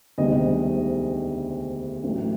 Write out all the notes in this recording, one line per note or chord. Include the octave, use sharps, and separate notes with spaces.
E1 D2 C3 D#3 G3 D#5
A1 A2 F#3 A3